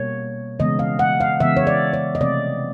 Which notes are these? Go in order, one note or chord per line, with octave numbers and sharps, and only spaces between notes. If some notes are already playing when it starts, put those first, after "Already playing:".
Already playing: B2 G3 A#3 C#5
C#3 E3 G#3 B3 D#5
F5
F#5
F5
C#3 E3 G#3 B3 E5
C#5
D5
C#5
D#5
C3 F3 A3 C4 D5